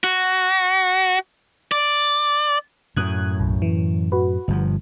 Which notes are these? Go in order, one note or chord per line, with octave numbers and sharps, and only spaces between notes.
F#4
D5
F#2 A2 D#6 F#6 G#6
B1
E3
F#4 B4
G1 G2 F3